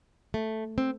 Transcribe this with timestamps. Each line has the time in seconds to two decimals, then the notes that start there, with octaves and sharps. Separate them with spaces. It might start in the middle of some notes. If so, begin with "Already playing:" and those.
0.34 A3
0.78 C4